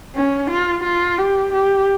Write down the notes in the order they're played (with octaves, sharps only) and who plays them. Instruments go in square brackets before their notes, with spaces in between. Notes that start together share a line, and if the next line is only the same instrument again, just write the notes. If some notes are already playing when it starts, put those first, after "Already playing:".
[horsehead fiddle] C#4
F4
F4
G4
G4